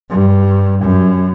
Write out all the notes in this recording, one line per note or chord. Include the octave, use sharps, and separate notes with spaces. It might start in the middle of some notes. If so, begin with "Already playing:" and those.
G2
F#2